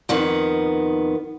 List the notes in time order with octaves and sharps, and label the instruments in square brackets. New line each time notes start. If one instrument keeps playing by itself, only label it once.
[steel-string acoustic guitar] F2 D#3 B3